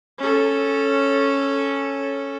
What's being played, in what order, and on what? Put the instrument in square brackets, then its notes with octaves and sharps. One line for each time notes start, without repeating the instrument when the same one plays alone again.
[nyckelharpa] C#4 A4